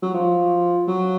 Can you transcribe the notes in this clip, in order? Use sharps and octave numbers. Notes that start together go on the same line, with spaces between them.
F#3
F3
F#3